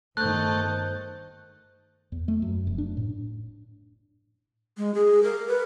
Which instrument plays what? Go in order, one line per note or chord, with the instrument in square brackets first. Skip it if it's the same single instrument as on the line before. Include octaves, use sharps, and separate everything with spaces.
[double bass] G1 D#3 [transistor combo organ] A3 [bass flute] C5 [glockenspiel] F#6 G6
[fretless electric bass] E2
A3
F#2
F1
D4
A2
[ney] G#3
G#4
A#4
B4